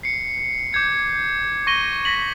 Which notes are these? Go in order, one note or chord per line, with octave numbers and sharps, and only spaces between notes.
C7 C#7
D6 G6 G#6 C#7
C#6 A#6 D#7 G7
A#6 B6 F#7